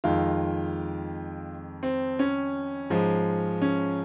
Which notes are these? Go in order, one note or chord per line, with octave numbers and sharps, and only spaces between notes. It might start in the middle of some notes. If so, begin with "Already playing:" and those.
F2 D#3 G#3 F4
C4
C#4
G#2 F3 G#3
C#4